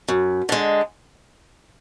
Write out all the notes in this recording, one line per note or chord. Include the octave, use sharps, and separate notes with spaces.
F#2
D3 G#3